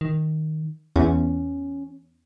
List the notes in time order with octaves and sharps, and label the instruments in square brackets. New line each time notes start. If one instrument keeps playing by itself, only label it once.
[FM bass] D#3
[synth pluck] E2 [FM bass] C#4